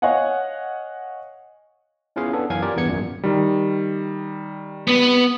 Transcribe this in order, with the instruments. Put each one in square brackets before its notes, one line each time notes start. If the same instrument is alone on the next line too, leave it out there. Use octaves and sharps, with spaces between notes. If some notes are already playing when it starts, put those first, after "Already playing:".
[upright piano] C#5 D#5 F5 F#5 G#5
[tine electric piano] B3 C#4 E4 F4 G#4 F5
B3 D4 A4
F#2 E3 C#4 F5 G#5 G#6
F4 G4 A#4 D5
E2 G2 B3 G#6 C#7
G#1 F#2 A#2
[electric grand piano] D#3 G3
[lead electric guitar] B3